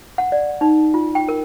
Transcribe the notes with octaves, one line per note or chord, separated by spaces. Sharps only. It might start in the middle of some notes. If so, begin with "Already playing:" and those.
F#5
D5
D#4
F4
G5
A#4